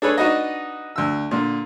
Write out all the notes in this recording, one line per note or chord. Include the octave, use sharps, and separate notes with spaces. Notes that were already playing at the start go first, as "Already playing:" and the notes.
D4 G#4 A4 B4 C#5
D4 D#4 F#4 B4 D#5
D2 E6
A#2 D3